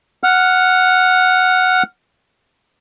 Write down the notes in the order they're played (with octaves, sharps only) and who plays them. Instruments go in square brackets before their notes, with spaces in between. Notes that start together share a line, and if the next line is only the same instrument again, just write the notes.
[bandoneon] F#5 F6